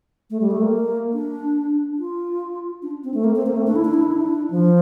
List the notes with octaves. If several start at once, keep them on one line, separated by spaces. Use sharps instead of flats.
A3
G3
A3
A#3
D4
F4
D4
C4
A3
A#3
C4
A#3
A3
D4
E4
D4
E4
D4
E4
D4
F3